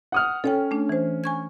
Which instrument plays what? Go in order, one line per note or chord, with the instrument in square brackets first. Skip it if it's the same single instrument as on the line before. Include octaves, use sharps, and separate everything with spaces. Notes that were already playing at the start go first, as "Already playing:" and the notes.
[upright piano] F#5 D#6 F6
[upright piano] C#4 [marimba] A4 C#5 G5
[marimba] A3 D4
E3 C5
G#5 C#6 G#6